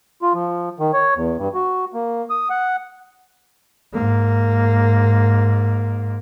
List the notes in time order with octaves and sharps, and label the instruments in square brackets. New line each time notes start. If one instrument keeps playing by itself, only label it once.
[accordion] F4
F3
D#3
C#5
E2
G2
F#4
A#3
D#6
F#5
[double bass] G#2 A#3